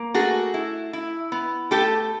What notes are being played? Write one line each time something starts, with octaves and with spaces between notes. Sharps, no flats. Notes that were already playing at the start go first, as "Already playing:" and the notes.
Already playing: A#3
A3 F#4 G#4
E4
E4
B3
A3 G4 A4